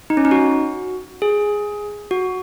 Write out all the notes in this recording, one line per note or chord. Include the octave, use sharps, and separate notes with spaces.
D#4
C#4
D#4
F#4
G#4
F#4